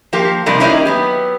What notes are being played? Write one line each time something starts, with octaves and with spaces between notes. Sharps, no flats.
F3 A#3 G4
C3 F3 G3 D#4 A4 A#4
A#3 C#4 D#4 E4 G4 A#4
F#3 B3 G4